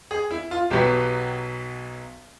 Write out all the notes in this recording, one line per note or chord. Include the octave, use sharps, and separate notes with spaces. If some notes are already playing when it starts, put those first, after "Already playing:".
G#4
E4
F4
B1 B2 F#3 B3 G4